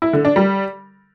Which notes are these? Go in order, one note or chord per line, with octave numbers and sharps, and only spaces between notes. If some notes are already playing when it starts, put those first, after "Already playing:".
E4
D3
D4
G3